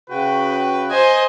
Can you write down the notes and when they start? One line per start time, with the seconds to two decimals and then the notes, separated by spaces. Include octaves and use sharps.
0.10 C#3 F#4 B4 G5
0.91 C5 D#5 G#5